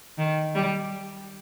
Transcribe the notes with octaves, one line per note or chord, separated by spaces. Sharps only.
D#3
G3